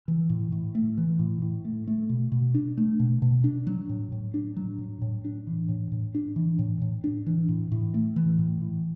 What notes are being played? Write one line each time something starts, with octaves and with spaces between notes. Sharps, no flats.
E3
A2
A2
A3
E3
A2
A2
A3
A3
B2
B2
D4
A3
B2
B2
D4
F#3
A2
A2
D4
F#3
A2
A2
D4
E3
A2
A2
D4
E3
A2
A2
D4
E3
A2
A2
A3
E3
A2
A2